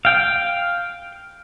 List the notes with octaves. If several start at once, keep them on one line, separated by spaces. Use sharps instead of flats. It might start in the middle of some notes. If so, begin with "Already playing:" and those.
F5 G5